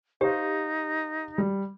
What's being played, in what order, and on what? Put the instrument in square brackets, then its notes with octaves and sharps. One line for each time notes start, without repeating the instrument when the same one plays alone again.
[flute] D#4 [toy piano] G4 [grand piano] C5 F5
[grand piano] G3